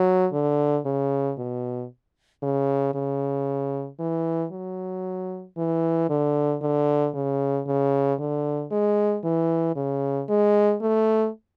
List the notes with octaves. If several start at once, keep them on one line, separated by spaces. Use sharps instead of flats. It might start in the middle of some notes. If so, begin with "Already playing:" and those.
Already playing: F#3
D3
C#3
B2
C#3
C#3
E3
F#3
E3
D3
D3
C#3
C#3
D3
G#3
E3
C#3
G#3
A3